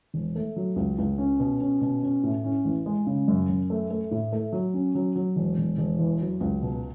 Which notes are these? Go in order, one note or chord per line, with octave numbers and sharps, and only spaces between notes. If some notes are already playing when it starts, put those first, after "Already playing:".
E1
A3
F#3
C#2
C#2
C#4
B2
C#4
B2
C#4
A2
C#4
A1
G#3
C#3
F#2
F#2
A3
A3
A2
A3
F#3
C#4
F#3
F#3
E1
E1
E1
E2
F#3
C#2
B2